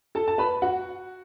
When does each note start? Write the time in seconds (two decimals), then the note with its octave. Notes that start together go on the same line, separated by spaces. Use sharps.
0.15 A4 A5
0.28 A5
0.38 B4 B5
0.62 F#4 F#5